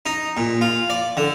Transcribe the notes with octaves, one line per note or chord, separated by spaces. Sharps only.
D#4
A#2
F4
D5
D3